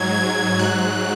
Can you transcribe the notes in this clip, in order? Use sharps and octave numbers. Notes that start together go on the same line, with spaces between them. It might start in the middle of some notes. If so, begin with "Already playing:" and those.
Already playing: G#2 F#3 G#6
G#6
G#2 F#3 F#6